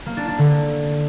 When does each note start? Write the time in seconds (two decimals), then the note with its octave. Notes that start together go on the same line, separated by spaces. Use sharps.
0.06 A#3
0.17 D4
0.28 D4
0.38 D3